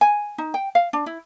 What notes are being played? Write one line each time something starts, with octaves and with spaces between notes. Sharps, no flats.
G#5
D#4
G5
F5
D4
E4